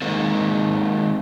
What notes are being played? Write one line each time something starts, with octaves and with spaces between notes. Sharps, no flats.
D#3 G#3 A#3 C4